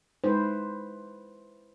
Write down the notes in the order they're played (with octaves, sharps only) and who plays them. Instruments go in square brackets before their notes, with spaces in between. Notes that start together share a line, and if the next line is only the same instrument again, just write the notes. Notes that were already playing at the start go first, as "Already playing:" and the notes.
[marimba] G#3 D#4 [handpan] E4 B4 C5